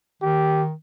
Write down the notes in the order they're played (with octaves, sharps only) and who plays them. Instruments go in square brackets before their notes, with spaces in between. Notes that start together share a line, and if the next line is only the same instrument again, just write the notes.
[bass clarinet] D#3 [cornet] G4